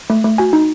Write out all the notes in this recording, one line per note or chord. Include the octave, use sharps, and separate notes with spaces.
A3
A3
F#4 G#5
D#4